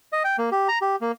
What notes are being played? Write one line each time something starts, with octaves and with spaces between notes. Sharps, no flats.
D#5
G5
A#3
G4
A#5
G4
A#3